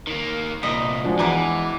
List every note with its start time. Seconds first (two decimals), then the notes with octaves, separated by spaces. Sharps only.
0.07 D#3 A#3
0.63 C2 A#2 D#5 B6
1.04 F3 G#3 D4 F#4
1.19 E2 E3 E4 A#5 D6